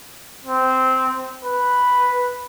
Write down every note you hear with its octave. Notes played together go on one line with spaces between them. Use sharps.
C4
B4